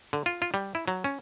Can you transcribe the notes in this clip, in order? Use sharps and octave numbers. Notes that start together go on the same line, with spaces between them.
D3
F4
F4
G3
E4
F#3
C#4